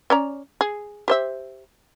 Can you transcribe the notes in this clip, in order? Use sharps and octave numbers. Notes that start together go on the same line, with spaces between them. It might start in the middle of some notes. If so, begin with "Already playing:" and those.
C#4 D5 A#5
G#4
G4 C5 E5